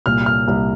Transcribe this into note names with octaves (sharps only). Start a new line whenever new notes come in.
C2 A#2 F6
F6
C2 A#2